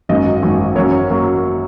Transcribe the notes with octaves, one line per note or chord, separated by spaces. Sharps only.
G#1 F#2 F#3 A#3 D#5
G#1 F#2 F#3 A#3
F#2 F#3 A#3 C#5
F#3 A#3